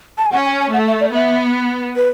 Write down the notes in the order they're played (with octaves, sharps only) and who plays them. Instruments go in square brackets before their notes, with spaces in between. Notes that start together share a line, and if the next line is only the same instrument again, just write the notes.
[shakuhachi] A5
G#5
[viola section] C#4 [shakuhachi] F#5
[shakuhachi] G#5
G#5
[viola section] A3 [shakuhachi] F#5
[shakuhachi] E5
D5
[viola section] B3 [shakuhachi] E5
[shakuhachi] B4